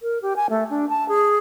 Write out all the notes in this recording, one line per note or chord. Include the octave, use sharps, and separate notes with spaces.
A#4
G4
G#5
A3
D4
A5
G#4